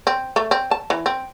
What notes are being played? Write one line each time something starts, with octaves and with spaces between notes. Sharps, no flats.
C4
A3
C4
A5
E3
C4